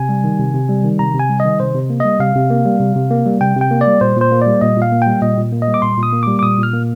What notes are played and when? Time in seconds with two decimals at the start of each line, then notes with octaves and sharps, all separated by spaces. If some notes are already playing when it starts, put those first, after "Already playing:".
Already playing: C3 G#5
0.09 G3
0.24 D#3
0.39 C3
0.54 C3
0.69 G3
0.84 D#3
0.99 C3 A#5
1.14 C3
1.20 G#5
1.30 G3
1.40 D#5
1.45 D#3
1.60 C3 C5
1.75 C3
1.90 A#3
2.00 G3 D#5
2.20 C3 F5
2.35 C3
2.50 A#3
2.66 G3
2.80 C3
2.96 C3
3.11 A#3
3.26 G3
3.41 C3 G5
3.56 C3 G5
3.71 A#3
3.81 D5
3.86 G3
4.01 A#2 C5
4.17 A#2 C5
4.32 A#3
4.42 D5
4.47 G3
4.61 A#2 D#5
4.77 A#2
4.82 F5
4.92 A#3
5.02 G5
5.07 G3
5.22 A#2 D#5
5.37 A#2
5.52 A#3
5.62 D#5
5.68 G3
5.74 D6
5.82 A#2 C6
5.97 A#2
6.03 D#6
6.13 A#3
6.23 G3 D6
6.39 D6
6.43 A#2 D#6
6.58 A#2 F6
6.73 A#3